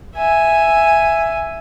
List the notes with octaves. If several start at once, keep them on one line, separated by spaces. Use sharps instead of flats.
E5 G#5